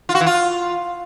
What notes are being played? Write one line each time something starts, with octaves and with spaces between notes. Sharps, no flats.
F4
F#4
E3
F4